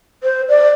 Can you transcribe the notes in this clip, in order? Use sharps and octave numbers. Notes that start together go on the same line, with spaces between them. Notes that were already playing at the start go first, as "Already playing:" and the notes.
C5
D5